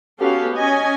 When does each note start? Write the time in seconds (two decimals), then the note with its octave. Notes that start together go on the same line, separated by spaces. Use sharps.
0.19 B3 C#4 F#4 G4 A4 F5
0.55 C#4 D#5 G#5